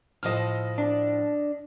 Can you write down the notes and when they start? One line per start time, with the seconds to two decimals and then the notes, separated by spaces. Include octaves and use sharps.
0.23 A2 F3 A4 D#5 F6
0.78 D4